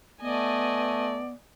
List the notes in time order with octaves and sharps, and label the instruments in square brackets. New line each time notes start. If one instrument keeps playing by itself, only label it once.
[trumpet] A3 [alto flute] B3 [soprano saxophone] D5 [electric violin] D#5 G#5